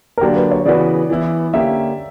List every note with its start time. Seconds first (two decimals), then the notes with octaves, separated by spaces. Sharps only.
0.18 A#4
0.21 D3 F#3 A#3 D4 G4
0.36 B4
0.51 C#5
0.65 C#3 E3 B3 F#4 B4 D5
1.10 E3 B3 E4
1.53 D3 A#3 C#4 G4 E5